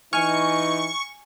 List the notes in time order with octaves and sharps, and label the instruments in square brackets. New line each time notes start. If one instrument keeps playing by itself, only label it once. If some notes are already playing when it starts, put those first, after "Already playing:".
[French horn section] E3 D#4 [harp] G#5 F6 [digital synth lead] C#6